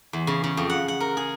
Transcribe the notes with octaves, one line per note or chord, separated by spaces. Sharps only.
E2
C#3
C#3
F2
F#5
F#5
A#4
G#4